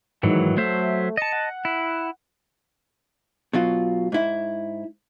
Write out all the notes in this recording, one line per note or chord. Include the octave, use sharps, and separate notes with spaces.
G#2 D#3 E3 F#3
F#3 A3 C5 E5
D#5 A5 C#7
F#5
E4
B2 F#3 F4
G#2 E4